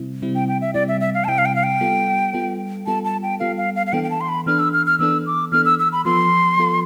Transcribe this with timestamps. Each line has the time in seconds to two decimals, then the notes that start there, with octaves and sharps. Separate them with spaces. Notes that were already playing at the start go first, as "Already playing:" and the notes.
Already playing: C3 G3 C4 E4
0.22 C3 G3 C4 E4
0.35 G5
0.48 G5
0.61 E5
0.74 C3 G3 C4 E4 D5
0.88 E5
1.01 E5
1.14 F5
1.24 A5
1.28 C3 G3 C4 E4 G5
1.38 F5
1.45 G5
1.56 F5
1.64 G5
1.81 G3 B3 F4 A4
2.33 G3 B3 F4 A4
2.86 G3 B3 F4 A4 A5
3.05 A5
3.23 G5
3.40 G3 B3 F4 A4 F5
3.57 F5
3.76 F5
3.86 F5
3.93 E3 B3 D4 A4 G5
4.03 G5
4.10 A5
4.21 C6
4.29 B5
4.46 E3 B3 D4 A4 F6
4.59 E6
4.73 F6
4.86 F6
4.99 E3 B3 D4 A4 E6
5.26 D6
5.52 E3 B3 D4 A4 F6
5.65 E6
5.79 E6
5.92 B5
6.05 F3 B3 F4 A4 C6
6.58 F3 B3 F4 A4